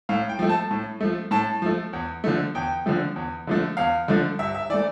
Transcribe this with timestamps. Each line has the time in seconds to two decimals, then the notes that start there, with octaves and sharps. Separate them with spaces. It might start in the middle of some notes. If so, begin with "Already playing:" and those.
0.09 A2 F5
0.29 G5
0.39 F3 A3
0.49 A5
0.71 A2
1.01 F3 A3
1.31 A2 A5
1.62 F3 A3
1.93 E2
2.24 D3 F3 A3
2.55 E2 G5
2.86 D3 F3 A3
3.16 E2
3.47 D3 F3 A3
3.77 E2 F5
4.08 D3 F3 A3
4.39 G2 E5
4.55 E5
4.70 E3 D5
4.74 A3